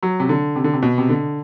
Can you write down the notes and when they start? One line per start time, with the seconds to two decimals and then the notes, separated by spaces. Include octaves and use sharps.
0.03 F#3
0.20 C3
0.29 D3
0.56 C3
0.64 D3
0.74 C3
0.82 B2
0.98 C3
1.09 D3